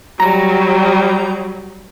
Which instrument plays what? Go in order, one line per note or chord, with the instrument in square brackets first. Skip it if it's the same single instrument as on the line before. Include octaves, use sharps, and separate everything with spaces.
[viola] F#3 G3 [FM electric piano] A#5